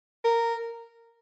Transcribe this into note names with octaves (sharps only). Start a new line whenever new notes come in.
A#4